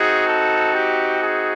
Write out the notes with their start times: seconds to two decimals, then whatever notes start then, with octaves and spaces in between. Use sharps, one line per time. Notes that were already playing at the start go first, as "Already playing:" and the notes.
Already playing: C4 D#4 F#4 G#4
0.27 A4
0.74 G4
1.22 G#4